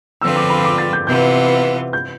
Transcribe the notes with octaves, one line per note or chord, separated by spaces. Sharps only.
D3 F3 C4 F4 B4 E6
D6
B5
D6
A6
G6
C3 E3 B3 F4 G6
G6